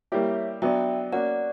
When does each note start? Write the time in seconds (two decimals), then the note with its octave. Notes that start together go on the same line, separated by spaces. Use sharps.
0.12 G3 A#3 E4 G4 C#5 E5
0.62 F#3 B3 D4 E5 G5
1.12 A#3 C#4 F#4 D5 F#5